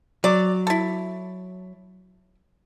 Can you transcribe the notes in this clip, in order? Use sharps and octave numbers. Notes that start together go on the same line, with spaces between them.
F#3 D5
E4 A4